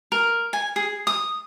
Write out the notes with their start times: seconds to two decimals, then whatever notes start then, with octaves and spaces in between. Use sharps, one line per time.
0.12 A#4
0.53 G#5
0.76 G#4
1.07 D#6